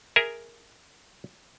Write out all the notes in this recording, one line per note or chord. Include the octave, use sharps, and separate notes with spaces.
G#4 A#4 E5